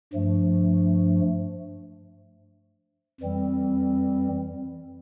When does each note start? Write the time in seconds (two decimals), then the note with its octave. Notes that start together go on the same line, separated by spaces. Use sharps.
0.14 G2 F3 A3
3.20 F2 E3 G3 C4